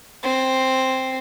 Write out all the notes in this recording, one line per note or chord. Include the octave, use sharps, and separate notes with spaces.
C4